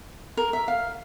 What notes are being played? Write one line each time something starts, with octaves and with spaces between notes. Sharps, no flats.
A#4
E5
F5